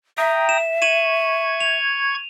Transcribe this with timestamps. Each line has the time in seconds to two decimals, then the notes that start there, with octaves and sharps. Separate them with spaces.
0.17 E5 G5 A#5 D#6
0.49 E7
0.82 C#6 G#6 D#7 E7 F#7
1.60 F7